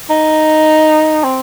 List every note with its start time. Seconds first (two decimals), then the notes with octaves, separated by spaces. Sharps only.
0.10 D#4
1.24 C4